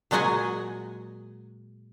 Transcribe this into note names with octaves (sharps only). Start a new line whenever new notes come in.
A#2 F#3 G#3 D#5 F#5 G#5